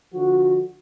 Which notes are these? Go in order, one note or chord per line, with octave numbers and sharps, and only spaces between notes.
D3 F3 F#4